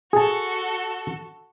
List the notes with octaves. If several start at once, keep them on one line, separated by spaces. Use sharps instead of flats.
F#4 G#4 A4 A5